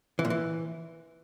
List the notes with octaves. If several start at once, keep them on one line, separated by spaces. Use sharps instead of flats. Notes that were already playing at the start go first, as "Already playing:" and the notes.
E3
A#2
E3